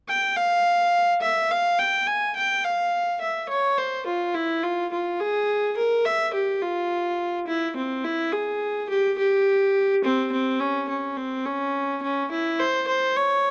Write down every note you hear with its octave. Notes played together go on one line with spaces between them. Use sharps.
G5
F5
E5
F5
G5
G#5
G5
F5
E5
C#5
C5
F4
E4
F4
F4
G#4
A#4
E5
G4
F4
E4
C4
E4
G#4
G4
G4
C4
C4
C#4
C#4
C4
C#4
C#4
E4
C5
C5
C#5